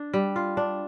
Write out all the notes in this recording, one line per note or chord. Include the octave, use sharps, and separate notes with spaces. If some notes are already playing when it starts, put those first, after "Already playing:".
Already playing: D4
G3
F4
D4